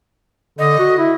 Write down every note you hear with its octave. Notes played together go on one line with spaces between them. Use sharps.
D3 D#5
F#4
E4